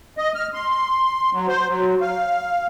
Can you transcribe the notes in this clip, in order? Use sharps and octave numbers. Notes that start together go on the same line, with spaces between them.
D#5
F6
C6
F#3
C5
F#3
F5